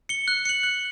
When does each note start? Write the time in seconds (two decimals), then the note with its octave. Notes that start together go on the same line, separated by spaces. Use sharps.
0.09 C#7 G7
0.28 F#6
0.45 C#7 F#7
0.63 F#6